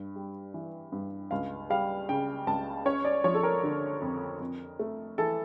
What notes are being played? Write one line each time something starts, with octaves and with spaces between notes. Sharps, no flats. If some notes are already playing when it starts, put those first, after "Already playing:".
Already playing: G2
G3
E3
G2
C#2 F5
G3 F5
C#3 G5
C#2 A5
C#4 C#5
D5
F3 C#5
A4
A#4
D3
F2
F2
A3
E3 A4